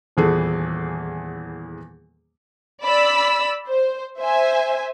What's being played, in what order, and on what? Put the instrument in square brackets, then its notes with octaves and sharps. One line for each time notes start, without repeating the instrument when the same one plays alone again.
[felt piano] D#1 E2 E3 G#4 A4
[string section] D5 B5 E6
C5
C5 E5 G#5